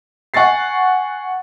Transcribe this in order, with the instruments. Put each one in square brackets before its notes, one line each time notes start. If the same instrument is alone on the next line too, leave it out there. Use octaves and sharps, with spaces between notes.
[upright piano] F#5 G#5 C#6 A6 C7